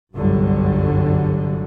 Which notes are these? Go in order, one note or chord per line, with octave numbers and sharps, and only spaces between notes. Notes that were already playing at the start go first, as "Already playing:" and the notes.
G1 C2 F#2 D3 F#3 G3